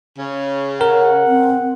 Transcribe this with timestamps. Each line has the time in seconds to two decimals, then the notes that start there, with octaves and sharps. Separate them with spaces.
0.19 C#3
0.81 A#4 F#5
1.27 C4